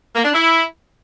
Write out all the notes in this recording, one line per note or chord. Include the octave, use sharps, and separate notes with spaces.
A#3
D4
E4